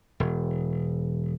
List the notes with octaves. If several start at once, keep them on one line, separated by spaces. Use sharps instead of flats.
E1